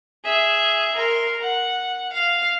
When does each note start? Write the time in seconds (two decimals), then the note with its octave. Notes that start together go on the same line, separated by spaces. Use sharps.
0.24 G#4 E5
0.96 A#4 C6
1.41 F#5
2.13 F5